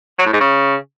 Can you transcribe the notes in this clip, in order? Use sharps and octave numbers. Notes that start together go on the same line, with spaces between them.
F#3
A2
G#2
C#3